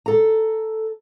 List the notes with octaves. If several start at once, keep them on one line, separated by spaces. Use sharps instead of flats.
A4 A#5